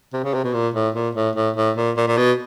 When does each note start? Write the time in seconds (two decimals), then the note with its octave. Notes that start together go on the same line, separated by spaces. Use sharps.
0.13 C3
0.24 C#3
0.34 C3
0.44 B2
0.54 A#2
0.75 A2
0.95 A#2
1.15 A2
1.36 A2
1.56 A2
1.76 A#2
1.97 A#2
2.08 A#2
2.17 B2